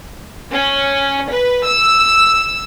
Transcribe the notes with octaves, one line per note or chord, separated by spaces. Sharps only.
C#4
B4
E6